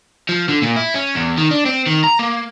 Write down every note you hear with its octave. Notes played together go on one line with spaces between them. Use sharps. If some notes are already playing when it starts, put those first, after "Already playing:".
F3
D3
A#2
E4
C#4
E2
D#3
D4
C4
D#3
A#5
A#3